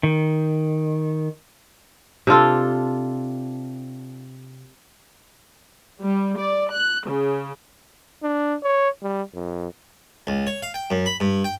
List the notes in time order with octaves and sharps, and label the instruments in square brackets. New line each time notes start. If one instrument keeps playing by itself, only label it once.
[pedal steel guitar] D#3
[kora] C3 D4 F4 A4
[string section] G3
D5
F#6
C#3
[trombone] D4
C#5
G3
F2
[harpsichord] C#2
C#5
F5
G5
F#2
B5
G2
G5